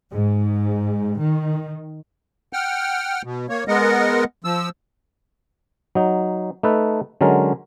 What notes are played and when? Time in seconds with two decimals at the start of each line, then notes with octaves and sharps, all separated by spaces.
0.11 G#2
1.19 D#3
2.53 F#5 G5 F6
3.24 B2
3.49 A#3 C#5
3.68 G#3 B3 A#4 D#5 F#5
4.44 F3 E6
5.95 F#3 D#4
6.63 A3 D#4 A4 B4
7.21 D3 F#3 G#3 C#4 A#4